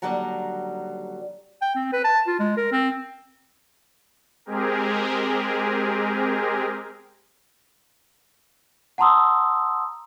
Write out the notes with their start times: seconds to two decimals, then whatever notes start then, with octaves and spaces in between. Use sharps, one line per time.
0.02 D#2 D3 F#3 G3 F#5 A#5
1.61 G5
1.75 C4
1.92 B4
2.04 A5
2.27 F4
2.39 G#3
2.57 A#4
2.72 C4
4.46 G#3 C4 G4 G#4 A#4
8.98 F#5 A5 A#5 C6 D#6 E6